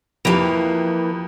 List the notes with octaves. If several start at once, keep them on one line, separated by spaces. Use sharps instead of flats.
F2 E3 A#3 E4 G4 D7 F7